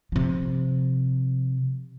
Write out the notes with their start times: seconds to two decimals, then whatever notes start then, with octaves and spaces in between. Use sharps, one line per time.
0.12 C3 F3